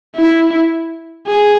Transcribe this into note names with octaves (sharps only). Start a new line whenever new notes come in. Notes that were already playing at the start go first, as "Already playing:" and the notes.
E4
G#4